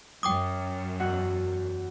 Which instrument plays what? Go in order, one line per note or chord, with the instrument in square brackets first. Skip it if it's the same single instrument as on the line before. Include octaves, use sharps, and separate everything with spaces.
[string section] F#2 [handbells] G5 D6 D#6
[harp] E2 F#4 F#5